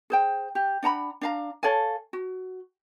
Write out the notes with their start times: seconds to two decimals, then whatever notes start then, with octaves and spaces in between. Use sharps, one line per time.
0.10 G#4 C5 G5
0.55 G4
0.83 D4 F#5 A#5 B5
1.21 D4 F5 A#5
1.63 A4 C#5 F5 G#5
2.13 F#4